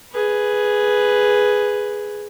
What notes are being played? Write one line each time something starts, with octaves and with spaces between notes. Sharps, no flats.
G#4 B4